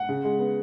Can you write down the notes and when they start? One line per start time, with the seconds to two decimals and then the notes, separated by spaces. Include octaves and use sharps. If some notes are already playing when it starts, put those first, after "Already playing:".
Already playing: F#5
0.09 C#3
0.24 G#3
0.39 B3